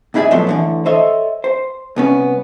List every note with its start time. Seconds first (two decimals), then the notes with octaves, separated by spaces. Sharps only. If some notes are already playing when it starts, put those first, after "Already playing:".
0.14 C#2 G#2 E4 G#4 D5 E5
0.31 A#2 F3 F#3 A3 B3 C6
0.47 A2 D3 E3
0.86 A4 C5 C#5 D#5 E5
1.44 C5
1.96 C2 B3 C#4